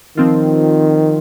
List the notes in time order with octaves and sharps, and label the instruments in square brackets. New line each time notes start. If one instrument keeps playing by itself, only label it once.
[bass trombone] D#3 [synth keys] F3 C4 F4